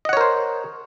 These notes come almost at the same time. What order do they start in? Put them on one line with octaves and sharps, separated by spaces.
D#5 F#5 C#5 A#4 C5